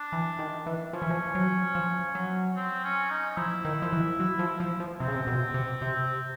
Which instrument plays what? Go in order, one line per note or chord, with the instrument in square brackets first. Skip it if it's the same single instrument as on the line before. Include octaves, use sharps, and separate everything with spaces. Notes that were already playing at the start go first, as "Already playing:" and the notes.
Already playing: [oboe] D4
[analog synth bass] E3
D#3
E3
[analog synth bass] F3 [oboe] C#4
[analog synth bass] E3
F3
F#3
F3
F#3
[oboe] C4
C#4
D#4
[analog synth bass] F3 [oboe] E4
[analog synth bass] D#3
F3
E3
F#3
F3
F3
F3
[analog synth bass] C3 [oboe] C4
[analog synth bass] C#3
C3
B2
C3
C3